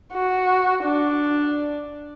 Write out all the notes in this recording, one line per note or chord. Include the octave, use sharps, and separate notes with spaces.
F#4
D4